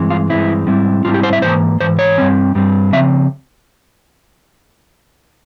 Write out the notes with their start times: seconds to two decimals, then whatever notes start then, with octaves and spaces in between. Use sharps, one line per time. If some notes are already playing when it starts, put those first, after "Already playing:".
Already playing: G2 E3 G#3 C4
0.10 F4
0.30 G2 E3 G#3 C4 E4
0.67 G#2 G3 C4 E4
1.05 G#2 G3 C4 E4 F4
1.14 G4
1.23 C5
1.33 E5
1.42 G#2 E3 A#3 C5
1.80 G#2 E3 C5
1.99 C#5
2.18 G2 G3 C4
2.55 G2 G3 C4
2.93 C#3 F3 C4 E5